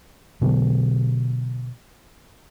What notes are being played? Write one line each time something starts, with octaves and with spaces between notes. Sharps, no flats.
B2 D3 F#3 B3